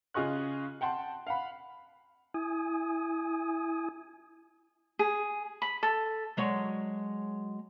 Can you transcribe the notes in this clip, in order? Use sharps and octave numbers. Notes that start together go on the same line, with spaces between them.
C#3 F4 G#4 D#5 C#6 F#6
F#5 G5 A5 C6
F5 F#5 B5
E4 G#5 D#6
G#4
B5
A4
F#3 G#3 C#5